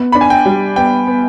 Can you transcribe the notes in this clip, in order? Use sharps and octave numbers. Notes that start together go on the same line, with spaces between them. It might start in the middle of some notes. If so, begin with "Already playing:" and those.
Already playing: B3
D4 B5
G#5
G5
G3
B3 G5
B3